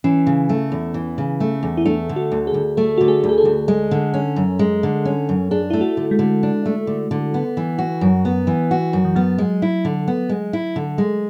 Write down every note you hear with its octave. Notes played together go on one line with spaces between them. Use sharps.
E3 C#4
C#3
A3
E2
E3
C#3
A3
E2
E4
A3 D4
D3
F#4
D2
G#4
D2
A3 A4
D3 F#4
G#4
D2
G#4
A4
D2
G#3
D3
C#4
F#2
G#3
D3
C#4
F#2
D4 G#4
A3 E4
F#4
D3
G#3
D3
D4
A3
D3
D3
B3
E3
F#4
F#2
B3
E3
F#4
F#2
E3
F#3 B3
G#3
E4
D3
B3
G#3
E4
D3
G#3